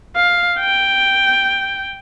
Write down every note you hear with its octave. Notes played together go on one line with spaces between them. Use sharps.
F5
G5